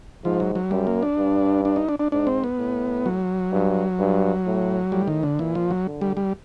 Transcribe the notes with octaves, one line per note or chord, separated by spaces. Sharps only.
G#2 F3
F#3
F#3
F#2 G3
A#3
D4
G2
D4
D#4
D4
D4
G#2 D4
C4
B3
A2
F#3
G2
G2
A2
A2 G3
D#3
D3
A#2 E3
F3
F#3
D3
G3
G3